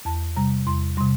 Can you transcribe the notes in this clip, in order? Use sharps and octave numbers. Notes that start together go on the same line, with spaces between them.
E2 A5
C3 G3 A#5
E2 C6
C3 G3 C6